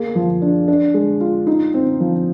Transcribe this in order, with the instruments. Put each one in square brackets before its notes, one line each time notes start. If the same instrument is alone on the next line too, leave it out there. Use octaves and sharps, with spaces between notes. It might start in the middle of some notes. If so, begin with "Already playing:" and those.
Already playing: [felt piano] A#3 G#4
F3
D4
D4
G#3
F4
D#4
C4
F3